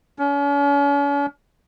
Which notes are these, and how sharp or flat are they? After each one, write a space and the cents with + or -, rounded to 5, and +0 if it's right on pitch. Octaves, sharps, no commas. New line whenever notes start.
C#4 +40